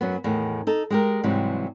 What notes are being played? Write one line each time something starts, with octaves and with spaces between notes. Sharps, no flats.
F#2 F#3 B3
E2 A2 D#3
D#4 A4
G#3 G4 A#4
G#2 C3 E3 F#3 G3